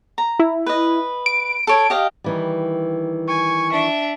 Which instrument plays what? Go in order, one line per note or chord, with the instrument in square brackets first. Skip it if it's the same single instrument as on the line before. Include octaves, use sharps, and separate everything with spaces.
[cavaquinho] A#5
[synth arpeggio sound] E4
[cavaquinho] B4 D#5
[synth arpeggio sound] D7
[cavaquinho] A4 C#5
G4 D#5 F5
[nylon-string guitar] D#3 E3 G3
[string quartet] G#5 [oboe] C#6
[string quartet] D4 E5